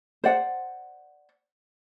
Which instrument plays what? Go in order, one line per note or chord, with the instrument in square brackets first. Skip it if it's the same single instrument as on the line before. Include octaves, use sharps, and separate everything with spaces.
[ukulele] C5 D5 F#5